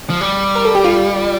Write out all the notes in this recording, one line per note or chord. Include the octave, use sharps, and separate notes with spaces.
F3
G3
A#4
A4
G4
F4